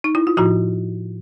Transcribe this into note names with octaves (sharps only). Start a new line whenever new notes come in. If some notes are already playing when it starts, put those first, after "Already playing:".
D#4
E4
F4
A2 F3 E4 F#4